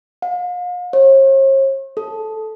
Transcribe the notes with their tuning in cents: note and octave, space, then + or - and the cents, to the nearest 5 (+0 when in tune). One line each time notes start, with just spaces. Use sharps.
F5 +40
C#5 -45
A4 -10